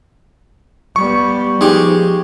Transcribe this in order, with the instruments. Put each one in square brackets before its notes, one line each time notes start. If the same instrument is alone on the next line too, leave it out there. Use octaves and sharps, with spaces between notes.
[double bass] G3 B3 [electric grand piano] C#6
[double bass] F3 [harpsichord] G#3 G4 [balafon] D#4